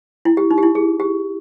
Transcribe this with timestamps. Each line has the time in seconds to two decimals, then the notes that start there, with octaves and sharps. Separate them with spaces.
0.25 E4
0.37 G4
0.51 D#4
0.58 G4
0.63 E4
0.75 G#4
1.00 G4